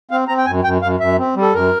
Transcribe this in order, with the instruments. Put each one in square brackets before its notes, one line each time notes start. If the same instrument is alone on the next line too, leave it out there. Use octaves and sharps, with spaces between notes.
[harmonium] C4 F5
C4 A#5
G5
F#2 G#5
F#2 G5
F#2 F5
F#2 E5
C4
G3
A4
F#2 A#4